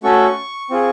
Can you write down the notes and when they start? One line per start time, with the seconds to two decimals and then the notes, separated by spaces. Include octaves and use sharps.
0.04 A3 C#4 F#4 A4 C#6
0.70 C4 F4 G#4